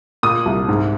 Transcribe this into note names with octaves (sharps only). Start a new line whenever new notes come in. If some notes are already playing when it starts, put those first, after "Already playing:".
A#2 D#6
C2
G#2